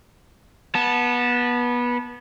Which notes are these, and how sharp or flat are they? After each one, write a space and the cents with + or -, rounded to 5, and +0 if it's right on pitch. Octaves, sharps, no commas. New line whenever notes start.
B3 -20 A5 +0